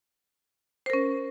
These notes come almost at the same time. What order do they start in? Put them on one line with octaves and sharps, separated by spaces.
C5 A#4 C#4